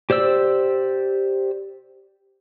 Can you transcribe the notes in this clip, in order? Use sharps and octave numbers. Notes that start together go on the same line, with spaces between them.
G4 C5 D5 E6